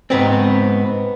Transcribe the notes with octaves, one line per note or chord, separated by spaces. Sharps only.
G#2 B3 C4